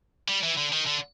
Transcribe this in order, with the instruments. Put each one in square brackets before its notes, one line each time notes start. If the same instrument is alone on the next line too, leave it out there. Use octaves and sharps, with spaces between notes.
[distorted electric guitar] G3
E3
D3
D#3
D3